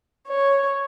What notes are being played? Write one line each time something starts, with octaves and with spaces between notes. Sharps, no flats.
C#5